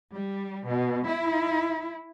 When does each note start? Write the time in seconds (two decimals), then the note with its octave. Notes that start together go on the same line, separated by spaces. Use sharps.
0.13 G3
0.65 B2
1.07 E4